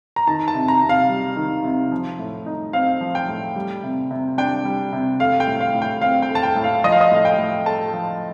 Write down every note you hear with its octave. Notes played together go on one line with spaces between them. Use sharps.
A#5
D#3 A5
A5
C3
A#5
C3
F5
G3
D#3
C3
F3
A2
D#4
C4 F5
F3
G5
A2
G3
C3
C3
D4 G5
G3
C3
A3 F5
G5
A2
F5
A2
G5
C4 F5
G5
A3
A5
G5
A2
F5
F3 D#5
F5
D#5
A2 F5
G5
A2
A3 A5
F3